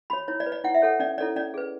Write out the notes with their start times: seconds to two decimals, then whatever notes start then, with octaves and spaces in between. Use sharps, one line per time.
0.10 F#4 C#5 B5
0.28 E4 C#5
0.40 D5
0.46 B4
0.52 D5
0.64 E4 F#5
0.75 E5
0.82 A4 C#5 F#5
1.00 C#4 D5
1.18 E4 A4 C#5 D5
1.36 C#4 D5
1.54 G#4 B4